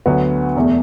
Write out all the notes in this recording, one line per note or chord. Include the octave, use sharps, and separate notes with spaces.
D2 D3 F#3 B3 F#4
E1 E2 B2 A3